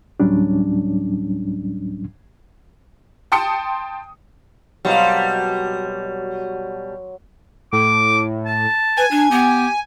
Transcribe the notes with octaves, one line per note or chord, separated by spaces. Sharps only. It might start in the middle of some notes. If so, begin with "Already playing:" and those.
D2 A2 F#3 G3 C#4 D4
G5 A5 C6 D#6 C#7
B2 F#3 G3 A#3 C4 F#4 C6
A2 D6
A5
B4 G#5
D4
B3 G4